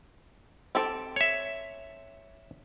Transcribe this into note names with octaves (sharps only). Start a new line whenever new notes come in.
C4 G4 A4
C#5 E5